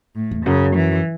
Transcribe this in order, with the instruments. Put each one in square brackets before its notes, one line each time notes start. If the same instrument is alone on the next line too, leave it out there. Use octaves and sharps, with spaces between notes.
[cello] A2
[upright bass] E2
[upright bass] F#2 [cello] C#3
[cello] E3